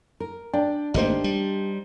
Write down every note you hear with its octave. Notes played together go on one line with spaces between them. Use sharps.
A#4
D4 D5 G5
G#1 A3 A#3 D4 D#4 G4 C5
G3